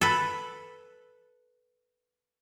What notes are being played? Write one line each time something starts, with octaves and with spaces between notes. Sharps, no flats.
A4 B4